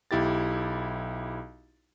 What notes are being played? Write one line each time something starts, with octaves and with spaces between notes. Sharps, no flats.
B1 E4 G4 A6